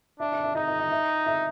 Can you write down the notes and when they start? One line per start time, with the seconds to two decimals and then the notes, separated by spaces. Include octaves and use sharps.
0.20 D4 E5
0.32 E5
0.44 E5
0.55 D#4 D#5
0.68 D#5
0.80 D#5
0.92 E5
1.26 E5